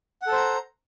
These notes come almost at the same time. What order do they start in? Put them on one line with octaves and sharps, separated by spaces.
F#5 A4 C5 A#5